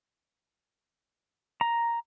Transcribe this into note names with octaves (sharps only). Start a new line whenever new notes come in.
A#5